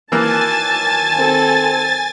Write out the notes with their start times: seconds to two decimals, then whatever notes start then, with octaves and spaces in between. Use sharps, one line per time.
0.12 D#3 E3 F#3 A#3 G#5 A5 A6
1.17 C4 A4